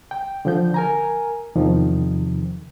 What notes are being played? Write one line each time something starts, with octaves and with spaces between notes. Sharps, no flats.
G5
D3 F3 G6
A#4 G#5 A#5
E2 C3 D#3 F3